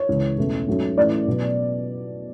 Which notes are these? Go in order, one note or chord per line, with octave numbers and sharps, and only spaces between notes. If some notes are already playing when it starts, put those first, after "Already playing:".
Already playing: C#5
C#2 C#3 E3 G#3
E2 B2 A3 C#4
G#2 F#3 A3 C#4
A2 E3 A3 C#4 D5
B2 F#3 B3